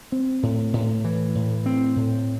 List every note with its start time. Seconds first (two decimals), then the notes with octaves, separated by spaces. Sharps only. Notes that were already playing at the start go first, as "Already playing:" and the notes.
0.12 C4
0.43 A2
0.73 A2
1.04 E3
1.35 A2
1.66 C4
1.96 A2